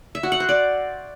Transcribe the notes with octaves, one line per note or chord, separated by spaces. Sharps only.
E5
F#4
F#5
C5
D5